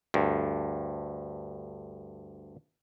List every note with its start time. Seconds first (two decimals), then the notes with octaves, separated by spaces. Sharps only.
0.14 D2 G2